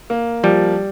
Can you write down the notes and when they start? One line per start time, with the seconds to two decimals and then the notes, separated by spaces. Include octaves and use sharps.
0.10 A#3
0.44 F3 G3